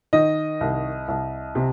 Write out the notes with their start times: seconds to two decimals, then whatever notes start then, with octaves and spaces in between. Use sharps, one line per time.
0.13 D#3 D#5
0.61 C2
1.08 C2
1.55 C3